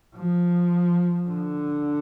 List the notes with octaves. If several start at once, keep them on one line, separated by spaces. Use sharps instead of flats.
F3
D3